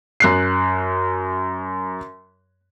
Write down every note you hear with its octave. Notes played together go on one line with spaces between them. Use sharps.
F#2 F#6 C7